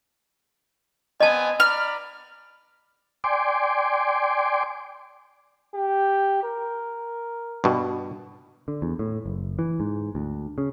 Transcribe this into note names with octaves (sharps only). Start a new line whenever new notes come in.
B3 C4 D#5 G#5 A5
D5 A#5 B5 F6
D5 G5 G#5 C6 D6
G4
A#4
G2 B2
D3
E2
A2
F#1
E3
G#2
D2
C#3